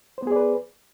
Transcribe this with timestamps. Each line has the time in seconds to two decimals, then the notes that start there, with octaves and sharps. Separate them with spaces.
0.18 C5
0.23 B3
0.27 G#4
0.32 D5
0.36 B4